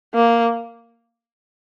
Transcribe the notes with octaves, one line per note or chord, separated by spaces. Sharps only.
A#3